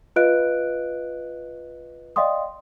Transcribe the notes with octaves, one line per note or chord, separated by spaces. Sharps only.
F4 B4 D#5 F5 F#6 D7
D5 D#5 F5 G5 C6 D#6